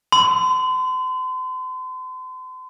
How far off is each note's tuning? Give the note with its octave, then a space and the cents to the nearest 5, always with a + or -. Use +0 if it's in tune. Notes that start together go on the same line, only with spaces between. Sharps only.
C6 -40